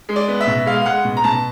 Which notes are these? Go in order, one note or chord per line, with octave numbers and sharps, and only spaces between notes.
G#3
D5
B3
E5
B2
G#3 F5
F5
G#3 F#5
B2
A#5
B2 A5